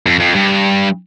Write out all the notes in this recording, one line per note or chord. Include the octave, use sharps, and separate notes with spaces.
F2
F2
G2